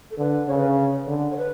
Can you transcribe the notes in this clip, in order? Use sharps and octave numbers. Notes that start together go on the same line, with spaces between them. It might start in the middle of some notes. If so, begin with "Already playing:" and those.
A4
D3 B4
C#3 C#5
A4
B4
D3
C#5
B4